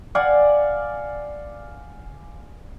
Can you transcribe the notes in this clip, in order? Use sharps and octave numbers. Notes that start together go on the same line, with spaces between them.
D5 F5 F#5 G#5